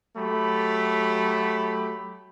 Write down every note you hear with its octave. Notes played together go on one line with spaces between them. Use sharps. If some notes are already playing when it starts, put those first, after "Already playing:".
F#3 A3 G4 B5